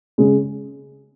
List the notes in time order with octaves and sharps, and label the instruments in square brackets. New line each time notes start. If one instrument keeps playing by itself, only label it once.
[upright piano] C#3 G#3